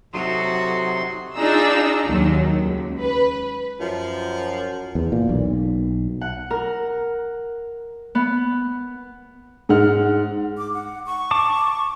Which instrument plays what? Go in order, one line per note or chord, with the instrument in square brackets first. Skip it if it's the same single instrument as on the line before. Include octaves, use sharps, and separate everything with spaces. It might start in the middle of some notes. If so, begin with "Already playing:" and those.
[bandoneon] C3 C6 [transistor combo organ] F#3 D#4 [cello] F#4 A4
[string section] D4 D#4 F4 G#4 A#5 E6
D#2 D#3 F#3
C#2
B4
[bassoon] F#2 [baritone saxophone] F3
[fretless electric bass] E2
A#2
B1
[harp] F#5
A#4
B3
[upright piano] G#2 G#3 F#5 F6
[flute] D6
F#5
C#6
[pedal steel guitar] A5 D6